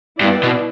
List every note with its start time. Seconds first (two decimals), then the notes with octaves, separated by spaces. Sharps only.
0.21 G2 B3 E4 B4 D5
0.43 B2